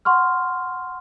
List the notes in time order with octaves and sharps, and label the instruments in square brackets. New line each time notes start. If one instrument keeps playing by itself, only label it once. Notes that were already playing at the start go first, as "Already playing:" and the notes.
[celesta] F#5 C6 C#6 F6